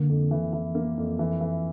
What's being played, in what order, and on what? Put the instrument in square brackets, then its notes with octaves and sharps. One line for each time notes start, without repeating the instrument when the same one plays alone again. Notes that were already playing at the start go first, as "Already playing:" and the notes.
Already playing: [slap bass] D3 [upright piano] A#3
[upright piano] F2
E3
E3
A#3
F2
E3
E3